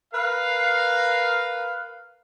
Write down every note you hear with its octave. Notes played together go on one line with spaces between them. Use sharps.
A#4 B4 F5